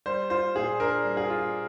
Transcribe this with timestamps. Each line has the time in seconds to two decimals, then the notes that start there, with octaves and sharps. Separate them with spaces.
0.06 G3 C5
0.30 F4 C5
0.55 A#2 G#4
0.80 D4 A#4
1.04 G3
1.17 G#4
1.30 F4